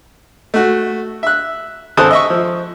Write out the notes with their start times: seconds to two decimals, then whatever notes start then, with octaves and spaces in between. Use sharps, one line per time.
0.54 A3 F#4
1.23 E5 F#6
1.97 G#1 A4 C5 A5 D#6 F#6
2.11 D#5 E5 C#6
2.30 F3